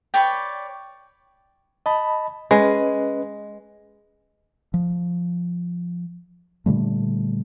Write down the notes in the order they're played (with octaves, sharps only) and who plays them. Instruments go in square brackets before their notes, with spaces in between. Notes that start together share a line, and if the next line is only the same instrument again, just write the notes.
[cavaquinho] B4 C#5 D5 G5
[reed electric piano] D#5 A5 B5
[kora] G#3 [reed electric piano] C#4 B4 D#5
[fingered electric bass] F3
A#2 D3 G3 A3